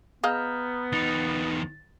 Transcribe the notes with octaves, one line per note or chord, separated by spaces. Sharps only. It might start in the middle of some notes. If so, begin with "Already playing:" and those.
B3 G#4 D#5 F5 A#5 F6 G6
E2 D#4 A6